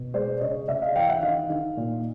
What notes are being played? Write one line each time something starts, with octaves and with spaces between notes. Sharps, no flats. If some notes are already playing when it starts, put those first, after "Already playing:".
Already playing: B2
G#3 C5 D5
C#3 C#5 D#5
C#3 D5 E5
D#5 F5
E3 F5 G5
E5 F#5
D#3 D#5 F5
D#3
A#2